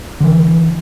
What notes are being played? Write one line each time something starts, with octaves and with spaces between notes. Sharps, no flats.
D3 E3